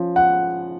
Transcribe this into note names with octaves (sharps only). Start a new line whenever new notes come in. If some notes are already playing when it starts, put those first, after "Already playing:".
Already playing: F3 C#4
F#5